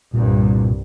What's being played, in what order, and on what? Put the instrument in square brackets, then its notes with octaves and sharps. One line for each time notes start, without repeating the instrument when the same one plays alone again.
[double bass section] C2 G2 [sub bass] A#2